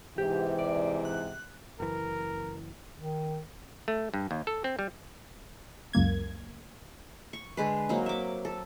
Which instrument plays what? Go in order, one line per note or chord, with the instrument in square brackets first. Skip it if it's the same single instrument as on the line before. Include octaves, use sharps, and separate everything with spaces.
[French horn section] G#2 C3 E3 [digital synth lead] G4
[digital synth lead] D5
F#6
[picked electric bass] F#1 E3 [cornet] A#4
[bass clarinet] D#3
[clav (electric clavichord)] A3
G2
D#2
A4
C4
G3
[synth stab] C#2 F#2 A#3 G#6
[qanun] C#6
D3 G#3 B4
F#3 A#3 C4 D#4
E5 D6
A4